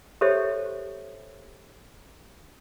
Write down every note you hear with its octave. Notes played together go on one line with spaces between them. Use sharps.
G4 A4 C5 C#5 E5